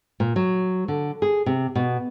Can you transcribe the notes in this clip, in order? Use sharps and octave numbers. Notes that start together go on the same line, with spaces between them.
A#2
F#3
D3
G#4
C3
B2